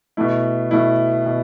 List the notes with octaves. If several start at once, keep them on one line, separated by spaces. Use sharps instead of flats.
B2 A3 E4
B2 A3 E4
B2